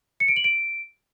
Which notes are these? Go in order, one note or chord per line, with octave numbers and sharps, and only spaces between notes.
C#7
D7
F#7
D7